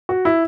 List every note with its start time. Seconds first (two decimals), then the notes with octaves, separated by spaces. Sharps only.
0.09 F#4
0.25 E4